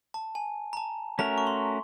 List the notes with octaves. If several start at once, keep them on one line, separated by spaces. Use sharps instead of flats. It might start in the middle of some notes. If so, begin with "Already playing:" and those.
A5
G#5
A#5
A5
A3 C#4 F#4 A#4 A#5
C#6
C6